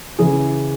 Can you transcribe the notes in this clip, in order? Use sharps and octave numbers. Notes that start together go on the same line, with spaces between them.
C#3 E3 G#4